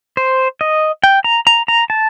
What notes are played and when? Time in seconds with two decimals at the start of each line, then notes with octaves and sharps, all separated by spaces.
0.17 C5
0.61 D#5
1.04 G5
1.24 A#5
1.47 A#5
1.68 A#5
1.90 A5